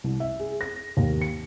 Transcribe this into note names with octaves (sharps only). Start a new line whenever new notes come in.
C2
E5
G#4
A#6
D#2
C#7